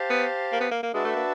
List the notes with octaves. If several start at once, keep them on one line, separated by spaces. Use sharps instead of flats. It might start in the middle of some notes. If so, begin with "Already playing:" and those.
Already playing: G4 C5 F5 A5
B3
A#3
B3
A#3
A#3
G#3 D4 F#4 B4 E5 A5
A3
A#3